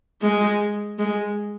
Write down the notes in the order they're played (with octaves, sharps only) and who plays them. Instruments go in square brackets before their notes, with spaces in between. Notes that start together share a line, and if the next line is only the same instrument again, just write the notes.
[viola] G#3
G#3